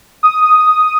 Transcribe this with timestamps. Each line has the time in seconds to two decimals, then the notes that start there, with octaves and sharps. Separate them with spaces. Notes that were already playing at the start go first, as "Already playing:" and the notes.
0.23 D#6